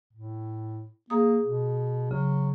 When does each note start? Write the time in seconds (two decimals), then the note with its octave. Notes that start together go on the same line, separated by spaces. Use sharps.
0.13 A2
1.10 A#3 G#4 A#5 D#6
1.45 B2
2.11 C#3 F#3